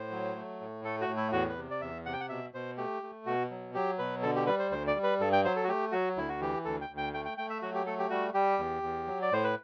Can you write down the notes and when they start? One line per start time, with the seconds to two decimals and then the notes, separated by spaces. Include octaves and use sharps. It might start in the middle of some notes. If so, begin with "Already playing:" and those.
Already playing: A2 C5
0.11 F#3
0.36 A3
0.61 A2
0.85 A3 A4
1.01 F#4
1.08 A2
1.17 E4
1.32 E2 F#4
1.49 B4
1.56 C3
1.71 D5
1.81 E2 E5
2.06 C3 F#5
2.13 G5
2.20 F#5
2.29 B2 E5
2.54 B2 C5
2.77 A3 G4
3.03 A3
3.26 B2 F#4
3.51 F#3
3.74 F#3 G4
3.98 B2 B4
4.23 D3 A4
4.36 G4
4.47 G3 B4
4.59 C5
4.71 D2 C5
4.87 D5
4.96 G3
5.03 B4
5.20 G2 A4
5.33 G5
5.45 F#3 C5
5.56 A4
5.64 F#4
5.68 A3 G4
5.92 F#3 F#4
6.16 D2 E4
6.29 F#4
6.40 E3 G4
6.65 D2 A4
6.81 G5
6.89 D2
6.98 G5
7.14 A3 G5
7.25 G5
7.38 A3 G5
7.50 E5
7.62 F#3 F#4
7.75 G4
7.86 A3 A4
7.99 G4
8.10 G3 F#4
8.34 G3 G4
8.59 E2
8.83 E2
9.07 F#3
9.22 D5
9.32 A2 C5
9.44 B4